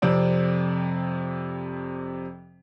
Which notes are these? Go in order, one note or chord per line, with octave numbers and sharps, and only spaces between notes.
F2 C3 C4 D5